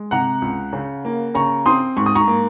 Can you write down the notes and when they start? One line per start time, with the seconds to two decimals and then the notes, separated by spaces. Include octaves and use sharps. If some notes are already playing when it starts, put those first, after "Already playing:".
Already playing: G#3
0.11 C3 F#5 A#5
0.42 C#2
0.73 C#3
1.05 A#3
1.34 C#3 A#5 C#6
1.66 C4 C6 D#6
1.97 G#2 C#6
2.06 D#6
2.15 A#5 C#6
2.28 A#3